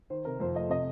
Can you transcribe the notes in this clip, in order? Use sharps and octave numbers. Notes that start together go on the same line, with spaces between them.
D#3 C5
C3 A#4
F2 C5
A3 D#5
C3 D#5